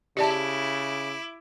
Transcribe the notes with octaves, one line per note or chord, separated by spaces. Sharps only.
C#3 E4 G4 D5 A5 D6